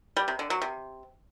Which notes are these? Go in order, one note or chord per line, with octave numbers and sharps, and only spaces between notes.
G3
C3
D3
F#3
C3